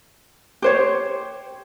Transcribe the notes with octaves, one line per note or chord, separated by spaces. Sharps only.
G4 C5 C#5